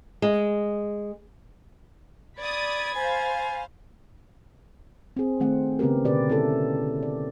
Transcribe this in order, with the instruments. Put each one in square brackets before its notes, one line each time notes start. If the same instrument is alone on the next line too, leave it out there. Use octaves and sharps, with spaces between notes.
[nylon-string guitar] G#3
[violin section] D5 D#6 [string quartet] B5 G#6 A6
[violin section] C5 F5 [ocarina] G#5
[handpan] C4 G#4
D#3 A3 C4 F#5
C#3 B3 C4 G4 A#4
B2 D3 G4 B4 D5
C#4 E4 A4
D5